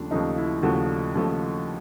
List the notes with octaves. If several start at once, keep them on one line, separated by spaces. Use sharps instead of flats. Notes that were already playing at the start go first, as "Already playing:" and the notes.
Already playing: D#2 C#3 F3 A3 D4
D#2 C#3 F3 A3 D#4
E4
D#2 C#3 F3 A3 F#4
D#2 C#3 F3 A3